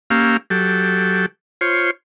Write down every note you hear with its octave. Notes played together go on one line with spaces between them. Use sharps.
A#3 C#4 G4 F5 E6
F#3 G4 A4
F4 C5 C#5